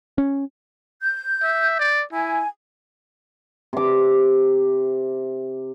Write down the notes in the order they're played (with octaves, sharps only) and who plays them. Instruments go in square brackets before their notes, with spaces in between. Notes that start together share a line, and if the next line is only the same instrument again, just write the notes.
[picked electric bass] C#4
[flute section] G6
[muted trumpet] E5
D5
[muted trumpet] E4 [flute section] G#5
[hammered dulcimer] C3 D6